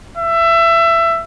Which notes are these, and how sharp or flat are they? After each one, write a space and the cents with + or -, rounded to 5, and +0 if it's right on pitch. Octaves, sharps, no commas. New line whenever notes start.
E5 +20